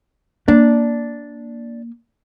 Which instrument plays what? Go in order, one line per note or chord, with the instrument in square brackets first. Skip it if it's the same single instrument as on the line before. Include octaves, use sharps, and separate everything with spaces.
[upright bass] A#3 [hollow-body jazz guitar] D4